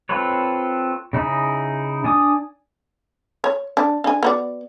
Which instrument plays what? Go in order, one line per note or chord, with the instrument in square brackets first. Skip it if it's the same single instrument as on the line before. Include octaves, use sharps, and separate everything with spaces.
[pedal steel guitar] C4 F4 A4 B4 C#5
C#3 D#4 E4 G#4
D4 G#5 D#6
[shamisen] C#5
D4
D4 G#5
B3 F#4 D5